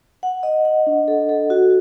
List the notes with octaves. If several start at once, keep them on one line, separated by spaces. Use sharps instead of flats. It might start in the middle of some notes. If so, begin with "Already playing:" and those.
F#5
D#5
F#5
D4
A4
A4
F#4